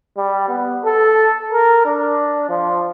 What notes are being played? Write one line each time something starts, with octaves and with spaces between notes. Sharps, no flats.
G3
B3
A4
A#4
D4
F3